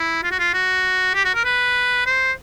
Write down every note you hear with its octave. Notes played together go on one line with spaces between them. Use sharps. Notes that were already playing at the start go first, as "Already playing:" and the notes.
Already playing: E4
F4
F#4
F4
F#4
G4
F#4
A#4
B4
C5